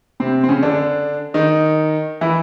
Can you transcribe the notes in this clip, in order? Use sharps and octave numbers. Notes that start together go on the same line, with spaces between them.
C3 C4
C4
C#3 C#4
D3 D4
D#3 D#4
E3 E4